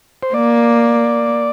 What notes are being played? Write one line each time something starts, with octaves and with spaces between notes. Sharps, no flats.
C5
A#3 D5